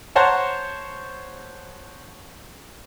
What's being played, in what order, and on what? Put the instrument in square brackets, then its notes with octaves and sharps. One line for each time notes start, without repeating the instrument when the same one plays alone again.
[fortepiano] C5 C#5 F#5 A5 A#5 C6